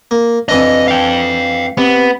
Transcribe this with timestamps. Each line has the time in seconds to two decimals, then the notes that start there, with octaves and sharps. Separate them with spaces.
0.11 A#3
0.49 F2 E3 D4 D#5
0.88 F5 G5
1.78 C3 B3